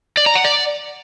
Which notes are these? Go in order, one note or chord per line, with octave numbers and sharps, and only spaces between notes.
D5
A#5
F#5
D5